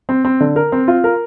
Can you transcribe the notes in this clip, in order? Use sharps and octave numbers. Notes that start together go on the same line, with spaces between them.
C4
C4
D3
A#4
C4
F4
A#4